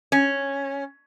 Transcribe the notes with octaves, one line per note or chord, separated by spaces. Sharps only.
C#4